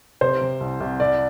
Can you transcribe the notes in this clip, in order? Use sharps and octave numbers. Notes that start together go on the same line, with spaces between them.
C3 C5
C3
C2
C2
C2 D5